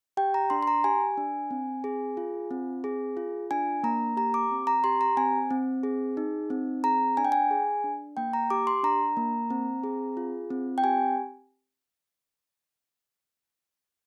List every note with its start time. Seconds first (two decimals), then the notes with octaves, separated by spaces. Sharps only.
0.17 G4 G5
0.34 A#5
0.50 D4 C6
0.63 C6
0.67 A#5
0.84 G4 G#5
1.17 D4
1.51 C4
1.84 G#4
2.17 F4
2.51 C4
2.84 G#4
3.17 F4
3.51 D4 G#5
3.83 A#3 A#5
4.17 G4 A#5
4.34 D6
4.51 C4
4.67 A#5
4.84 G4 C6
5.01 A#5
5.17 C4 G#5
5.51 C4
5.83 G#4
6.17 D#4
6.50 C4
6.84 G#4 A#5
7.17 D4 G#5
7.25 G5
7.32 G#5
7.51 G#4
7.84 D4
8.17 A#3 G5
8.33 A#5
8.50 G4 D6
8.67 C6
8.83 D4 A#5
9.17 A#3
9.50 C4
9.83 G#4
10.17 F4
10.50 C4
10.78 G5
10.84 G4 G#5